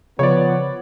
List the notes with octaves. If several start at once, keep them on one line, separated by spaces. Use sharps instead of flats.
C#3 F3 B3 C#5 D5